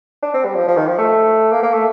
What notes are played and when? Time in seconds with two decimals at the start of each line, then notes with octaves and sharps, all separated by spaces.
0.23 D4
0.34 C4
0.45 G3
0.55 F3
0.68 F3
0.77 D#3
0.88 F3
0.98 A3
1.52 A#3
1.63 A#3
1.74 A3